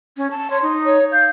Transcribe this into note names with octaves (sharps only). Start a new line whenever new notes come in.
C#4
A5
C#5 C6
D#4
C#5
F5 G6